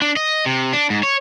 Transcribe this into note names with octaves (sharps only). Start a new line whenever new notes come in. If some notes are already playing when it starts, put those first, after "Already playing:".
D4
D#5
C3
D4
G#2
C#5